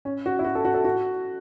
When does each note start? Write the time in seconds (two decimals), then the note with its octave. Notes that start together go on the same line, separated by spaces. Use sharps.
0.05 C#4
0.26 F#4
0.39 E4
0.44 F#4
0.55 A4
0.65 F#4
0.74 A4
0.85 F#4